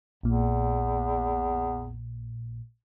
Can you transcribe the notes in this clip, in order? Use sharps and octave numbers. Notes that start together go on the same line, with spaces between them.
A#1 E2 A#2